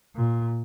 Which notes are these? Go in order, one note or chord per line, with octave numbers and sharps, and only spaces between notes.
A#2